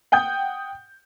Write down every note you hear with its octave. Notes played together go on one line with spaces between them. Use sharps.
F#5 G5 D#6 G6